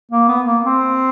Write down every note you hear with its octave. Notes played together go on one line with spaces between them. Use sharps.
A#3
B3
A#3
C4